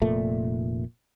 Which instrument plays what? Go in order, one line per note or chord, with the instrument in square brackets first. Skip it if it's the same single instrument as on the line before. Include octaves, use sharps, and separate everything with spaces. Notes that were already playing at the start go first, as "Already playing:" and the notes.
[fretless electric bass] F1 A#2 A3